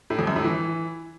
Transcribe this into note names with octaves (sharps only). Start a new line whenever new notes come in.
A2
F2
F#2
A2
E3